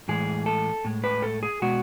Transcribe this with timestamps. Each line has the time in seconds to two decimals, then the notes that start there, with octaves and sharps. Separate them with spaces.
0.08 A2 E3 G#3 G#4
0.46 A4
0.85 A2 G#3
1.04 B4
1.22 A4
1.43 G#4
1.62 B2 G#3 F#4